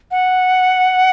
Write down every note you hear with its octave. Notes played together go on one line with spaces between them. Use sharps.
F#5